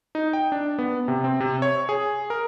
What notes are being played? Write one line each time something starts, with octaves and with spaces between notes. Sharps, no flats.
D#4
G5
D4
B3
C3
C4
C3
C#5
G#4
A#4